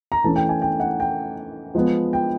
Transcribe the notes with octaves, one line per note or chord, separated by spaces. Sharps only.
A#5
E3 A3 C#4 A5
G5
G#5
G5
F#5
G5
F3 G#3 B3
G5